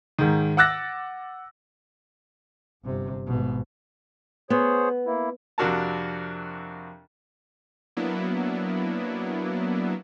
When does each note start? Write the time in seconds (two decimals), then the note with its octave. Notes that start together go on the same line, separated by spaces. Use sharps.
0.18 G#2 D#3
0.57 F#5 D6 E6 F#6 A6 A#6
2.84 G1 C3
3.27 G#1 B2
4.50 B3 G#4 C5 C#5
5.06 A#3 E4
5.58 F2 C3 D4 F#4 A#4 A5
7.97 F#3 A#3 B3 D4 E4